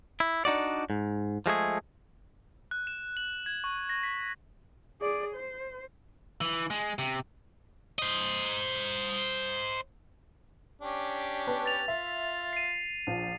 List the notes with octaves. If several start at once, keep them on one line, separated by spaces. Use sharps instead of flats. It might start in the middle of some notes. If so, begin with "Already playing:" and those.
E4
D4 D#4 F#4 D5
G#2
F3 G#3 A3 G#4
F#6
E7
F#7
G#6
C#6
A#6
B6
G#4 D5
C5
E3
G#3
C3
C5 D#5
C#4 D4 G4
B3 B4 A5
A6 F7
F4 E5
C7 D#7
A#1 F3